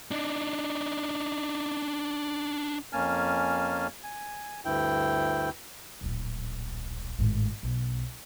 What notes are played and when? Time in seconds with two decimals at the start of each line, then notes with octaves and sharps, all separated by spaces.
0.11 D4 D#4
2.93 F2 A#3 C#4 G#5 A5 F6
4.03 G#5
4.65 D2 G2 E4 G5
6.01 D1 A#1
7.19 G#1 A2
7.63 B1